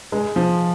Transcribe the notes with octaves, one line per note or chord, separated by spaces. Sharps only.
G#3
F3